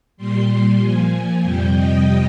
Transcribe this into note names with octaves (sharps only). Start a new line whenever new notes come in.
A#2 G3 C6
A#2 F3 G#5
F2 C3 G3 G5
D#5